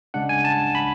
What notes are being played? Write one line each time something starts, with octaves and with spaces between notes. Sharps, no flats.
C#3 G#3 D4 F#5
G#5
A5
B5